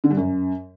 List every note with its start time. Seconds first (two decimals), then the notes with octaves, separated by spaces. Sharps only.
0.04 D3
0.10 G2
0.17 F#2